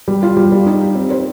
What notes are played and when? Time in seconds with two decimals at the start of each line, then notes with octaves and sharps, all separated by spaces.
0.08 G3
0.23 F4
0.37 G3
0.52 G3
0.66 D#4
0.81 G4
0.95 C4
1.10 C5